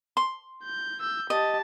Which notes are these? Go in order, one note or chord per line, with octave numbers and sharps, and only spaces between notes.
C6
G6
E6 G6
G4 D#5 A5